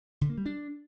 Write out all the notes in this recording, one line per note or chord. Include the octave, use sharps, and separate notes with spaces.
D3
A#3
G3
D4